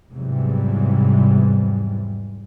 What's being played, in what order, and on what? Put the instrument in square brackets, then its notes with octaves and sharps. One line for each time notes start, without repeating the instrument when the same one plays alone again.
[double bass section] E2 G#2 C3 E3 F#3 G3